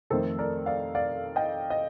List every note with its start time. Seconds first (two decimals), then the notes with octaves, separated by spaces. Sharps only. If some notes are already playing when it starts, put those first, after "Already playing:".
0.10 F2 D#3 A3 A4 C5
0.39 A#4 D5
0.66 D5 F5
0.95 D5 F5
1.36 D#5 G5
1.70 D#5